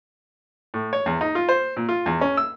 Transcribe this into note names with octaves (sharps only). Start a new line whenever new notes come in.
A2
C#5
E2
D#4
F4
C5
A#2
F4
E2
C#4
E6